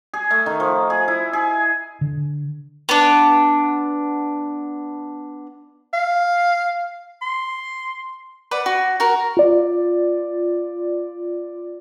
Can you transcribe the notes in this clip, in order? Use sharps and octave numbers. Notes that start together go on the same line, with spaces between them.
G#4
A3
D#3
F3
G#4
E4
G#4
D3
B3 D4
F5
C6
B4 D5 F#5
F#4
F#4 A#4
F4 D5